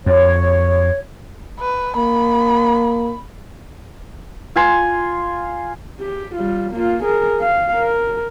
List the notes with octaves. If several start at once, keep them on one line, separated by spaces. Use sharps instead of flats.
F2 C#5
B4
A#3 B5
F4 G#5 C6
G4
G3 F4
A#3 F4
G#4 A#4
F5
A#4